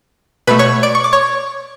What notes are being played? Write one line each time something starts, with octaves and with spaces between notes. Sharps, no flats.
B2 A3 B4 B5
C#5 C#6
D5 D6
C#6
D6
C#5 C#6